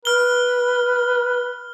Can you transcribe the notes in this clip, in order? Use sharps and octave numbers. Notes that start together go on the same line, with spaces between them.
B4 F6 G7